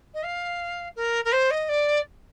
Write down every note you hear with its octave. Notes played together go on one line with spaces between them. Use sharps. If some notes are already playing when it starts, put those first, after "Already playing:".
D#5
F5
A#4
A#4
C5
D#5
D5